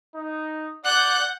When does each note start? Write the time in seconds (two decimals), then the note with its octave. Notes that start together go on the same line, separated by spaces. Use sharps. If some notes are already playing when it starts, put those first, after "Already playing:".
0.15 D#4
0.85 D5 F#5 F#6 G6